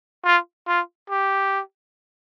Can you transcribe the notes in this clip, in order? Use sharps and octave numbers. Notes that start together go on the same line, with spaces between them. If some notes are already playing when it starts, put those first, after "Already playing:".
F4
F4
G4